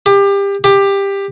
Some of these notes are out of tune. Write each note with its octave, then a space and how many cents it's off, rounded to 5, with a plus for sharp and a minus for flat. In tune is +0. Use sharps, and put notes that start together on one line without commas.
G4 +25
G4 +15